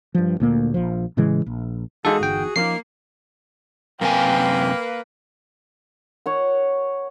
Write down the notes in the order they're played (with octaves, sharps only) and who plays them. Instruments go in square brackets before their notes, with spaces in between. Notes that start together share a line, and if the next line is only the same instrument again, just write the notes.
[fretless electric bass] G2 F3
D2 A#2 A#3
A#1 F3
A2 C#3 E3 G#3
A#1
[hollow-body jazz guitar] E2 D#4 F5 [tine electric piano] G#3 A4 [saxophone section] F#4 G#4
[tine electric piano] G1 G5
[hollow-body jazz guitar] F3 C#4 D#4 [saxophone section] A#3 [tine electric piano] C7
[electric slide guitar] F#2 C3 G#5 [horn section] A#3 B4 [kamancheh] G5
[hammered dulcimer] C#5 F#5